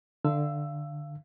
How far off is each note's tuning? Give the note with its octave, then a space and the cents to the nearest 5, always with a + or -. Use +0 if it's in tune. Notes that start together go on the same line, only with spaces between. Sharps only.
D3 +15 F5 -25 E6 +10